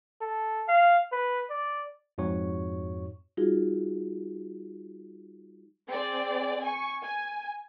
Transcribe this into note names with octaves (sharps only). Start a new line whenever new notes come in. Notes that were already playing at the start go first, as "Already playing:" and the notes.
A4
F5
B4
D5
F2 G#2 F#4 C#5 C#6
G3 D#4 F4 F#4 G#4
C4 G#4 D5
G#5 C#6
G#5